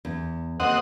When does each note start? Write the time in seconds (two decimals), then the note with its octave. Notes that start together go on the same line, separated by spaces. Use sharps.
0.05 E2
0.60 D#2 C4 D#5 F#5